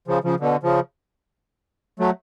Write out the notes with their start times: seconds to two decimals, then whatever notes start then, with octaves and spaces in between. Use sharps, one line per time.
0.08 C#3 F3
0.24 C#3 F3
0.40 B2 D3
0.63 C#3 F3
1.99 F#3 A3